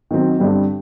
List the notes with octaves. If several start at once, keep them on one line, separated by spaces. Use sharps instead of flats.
D#3 F#3 C4
G2 D3 G3 C4